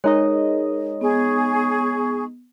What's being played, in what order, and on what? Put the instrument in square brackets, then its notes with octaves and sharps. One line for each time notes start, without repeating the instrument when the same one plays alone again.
[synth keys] G#3 D#4 D#5 [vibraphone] A#4 [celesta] C#5
[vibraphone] B3 [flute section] G#4 C#6